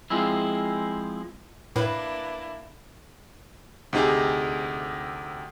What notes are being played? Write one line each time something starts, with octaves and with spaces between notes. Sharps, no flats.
F3 G#3 C4 E4
A2 A#3 D4 E4 B4
D2 C3 D#4 G4 G#4